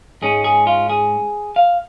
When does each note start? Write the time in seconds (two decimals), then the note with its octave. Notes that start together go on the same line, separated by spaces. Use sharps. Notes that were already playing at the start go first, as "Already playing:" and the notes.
0.22 G#2 G#3 C#4 G#4
0.44 G#4
0.67 F4
0.90 G#4
1.56 F5